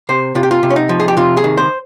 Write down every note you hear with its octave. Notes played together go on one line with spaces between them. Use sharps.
C3 C5
C3 F4
G4
F4
C3
C#4
D#4
F3
G#4
G4
C3 F4
G#4
D#3
C5